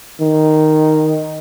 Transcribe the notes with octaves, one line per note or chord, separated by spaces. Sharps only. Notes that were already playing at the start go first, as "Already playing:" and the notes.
D#3